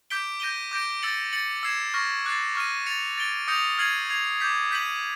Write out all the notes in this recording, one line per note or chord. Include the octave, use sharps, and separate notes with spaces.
D6 G6 B6 D7 G7
G6 A#6 D#7 G7
D6 G6 A#6 D7
E6 A6 C#7 F#7
A6 C#7 F#7
E6 G#6 C7 E7
C#6 F6 A#6
D6 F#6 A6 C7
C#6 F6 A#6 D#7
A6 C#7 F7
A6 D7 G7
D#6 G6 A#6 C#7 F7
F6 G#6 C7 D#7 F#7
G#6 C7 F7
D6 G6 B6
G6 B6 D#7 F#7